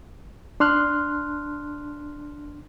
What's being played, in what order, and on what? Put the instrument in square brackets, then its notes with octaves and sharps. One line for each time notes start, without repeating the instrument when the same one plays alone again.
[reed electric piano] D4 C6 F6 F#6